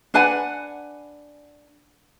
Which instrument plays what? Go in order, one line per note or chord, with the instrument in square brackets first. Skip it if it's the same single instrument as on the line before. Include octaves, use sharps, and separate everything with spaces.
[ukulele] D4 B4 F#5 G#5